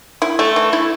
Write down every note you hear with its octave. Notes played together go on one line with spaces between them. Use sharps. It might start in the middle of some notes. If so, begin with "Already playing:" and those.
E4
A3
E3
E4